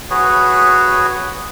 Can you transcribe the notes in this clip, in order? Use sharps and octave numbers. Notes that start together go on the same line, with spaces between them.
F#4 G#4 B4 C#5